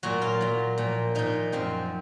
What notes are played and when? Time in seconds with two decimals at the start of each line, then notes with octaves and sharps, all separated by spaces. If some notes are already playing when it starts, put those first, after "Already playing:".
0.03 A#2 F#3 F#4
0.22 F4
0.41 A#2 F#3
0.78 A#2 F3
1.15 A#2 F3 D#4
1.52 F#2 F3 C4